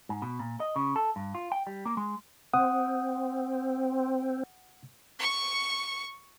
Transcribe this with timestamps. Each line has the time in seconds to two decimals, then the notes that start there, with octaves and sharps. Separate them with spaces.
0.09 G#2
0.22 B2
0.39 A#2
0.60 D#5
0.76 C#3
0.96 A4
1.16 G2
1.35 F4
1.52 G5
1.67 G3
1.85 A#3
1.97 G#3
2.53 C4 F#5 D#6
5.19 C#6 C#7